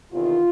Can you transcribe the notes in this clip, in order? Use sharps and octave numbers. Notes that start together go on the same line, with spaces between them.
E2 C3 D#3 F4